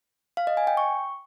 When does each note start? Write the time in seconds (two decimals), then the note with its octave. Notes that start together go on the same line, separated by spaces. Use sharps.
0.37 F5
0.47 D#5
0.57 G#5
0.67 G5
0.77 C#6